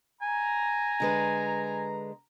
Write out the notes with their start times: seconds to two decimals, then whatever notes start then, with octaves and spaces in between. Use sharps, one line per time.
0.22 G#5 A#5
1.00 D3 G#3 B4